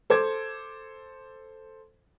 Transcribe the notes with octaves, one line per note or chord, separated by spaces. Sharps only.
A4 C5 D6 G#6